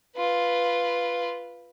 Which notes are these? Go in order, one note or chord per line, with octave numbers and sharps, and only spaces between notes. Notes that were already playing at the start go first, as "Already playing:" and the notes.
F4 B4